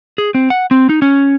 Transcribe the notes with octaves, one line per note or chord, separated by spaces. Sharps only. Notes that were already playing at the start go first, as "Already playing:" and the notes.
G#4
C4
F#5
C4
D#4
C#4